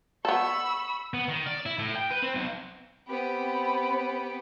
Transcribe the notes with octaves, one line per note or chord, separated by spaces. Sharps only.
B3 A4 B5 C#6 E6
B3
D#3
D5
E4
A2
G5
B4
C4
B1
B3 C4 G4 B5